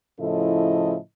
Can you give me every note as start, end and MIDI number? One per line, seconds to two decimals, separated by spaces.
0.20 0.95 45
0.20 0.95 49
0.20 0.95 53
0.20 0.95 64
0.20 0.95 69
0.20 0.95 75